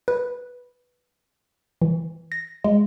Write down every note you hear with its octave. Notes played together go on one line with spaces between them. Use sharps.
B4
E3
A#6
G#3